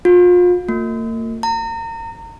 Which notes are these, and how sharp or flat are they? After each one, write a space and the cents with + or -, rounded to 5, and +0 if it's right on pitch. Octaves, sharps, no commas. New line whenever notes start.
F4 +35
A#3 -45
A#5 -35